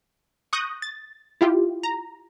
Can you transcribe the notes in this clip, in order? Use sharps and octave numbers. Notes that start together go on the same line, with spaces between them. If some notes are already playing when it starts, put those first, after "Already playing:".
C#6 D#6 F#6 G6 A#6
A6
E4 F4 G4
A#5